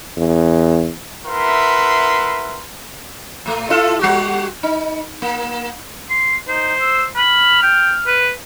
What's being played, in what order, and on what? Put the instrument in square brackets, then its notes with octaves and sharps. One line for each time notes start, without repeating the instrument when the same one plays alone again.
[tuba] E2
[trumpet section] E4 A#4 B4 E5 F#5 C6
[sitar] A2 A3
E4 F4 A4
G3 F#4 G4
D#4
A#3
[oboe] C6
[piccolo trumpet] D#4 [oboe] C5
[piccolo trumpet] E6
[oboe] B5 [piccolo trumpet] F6
[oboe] G5
B4